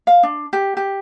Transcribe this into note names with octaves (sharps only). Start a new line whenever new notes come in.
F5
D4
G4
G4